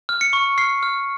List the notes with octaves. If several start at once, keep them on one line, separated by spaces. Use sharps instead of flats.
F6
C#7
C#6
F6 C7
F6